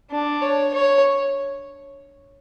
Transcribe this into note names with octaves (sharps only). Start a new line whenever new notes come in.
D4
C#5
C#5